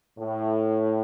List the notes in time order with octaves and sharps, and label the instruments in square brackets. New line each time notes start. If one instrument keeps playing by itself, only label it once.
[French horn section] A2